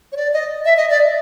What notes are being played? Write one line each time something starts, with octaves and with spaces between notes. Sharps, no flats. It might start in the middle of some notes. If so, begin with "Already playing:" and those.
C#5
D5
D#5
E5
D#5
D5